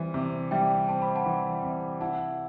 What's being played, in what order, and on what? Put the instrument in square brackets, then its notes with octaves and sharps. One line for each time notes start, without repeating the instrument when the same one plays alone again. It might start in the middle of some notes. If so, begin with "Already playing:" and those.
Already playing: [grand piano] E3 G3 C4
C3
[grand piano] G3 [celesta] E5 G5
[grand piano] C4 [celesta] A5
[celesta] B5
F#5 A5
[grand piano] E3
C3
[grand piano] E4 [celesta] F#5 A5